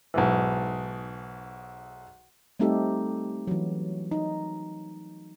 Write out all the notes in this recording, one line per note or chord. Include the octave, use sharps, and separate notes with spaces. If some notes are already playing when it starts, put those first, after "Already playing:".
B1 G#2 E3
G3 A3 C4 D#4 G4 A4
E3 F#3
D#4